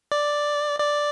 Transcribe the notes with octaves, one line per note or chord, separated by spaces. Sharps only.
D5
D5